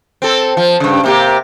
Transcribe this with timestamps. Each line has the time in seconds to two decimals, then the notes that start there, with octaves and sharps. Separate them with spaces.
0.22 C4 A4
0.57 F3
0.80 G2 C#3
1.03 C3 A#3 G4